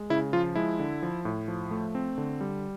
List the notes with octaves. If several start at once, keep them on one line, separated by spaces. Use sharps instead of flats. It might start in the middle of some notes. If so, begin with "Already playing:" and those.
Already playing: G#3
C#3 E4
F3 F4
G#3 E4
D3
F3
A2
F3
A3
C4
D3
G3